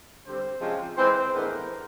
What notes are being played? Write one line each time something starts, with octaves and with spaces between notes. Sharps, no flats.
D3 G3 C4 C5
C3 F3 G#3 C#4
E3 G#3 C4 C5
A2 E3 G#3 B3 D4 A#4